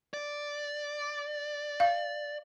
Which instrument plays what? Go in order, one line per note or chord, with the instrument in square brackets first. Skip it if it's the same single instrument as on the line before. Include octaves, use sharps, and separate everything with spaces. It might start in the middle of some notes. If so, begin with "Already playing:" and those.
[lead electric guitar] D5
[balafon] F5